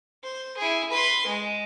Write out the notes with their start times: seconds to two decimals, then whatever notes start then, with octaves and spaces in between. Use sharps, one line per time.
0.24 C5
0.58 E4 G#4
0.91 B4 C6
1.27 G#3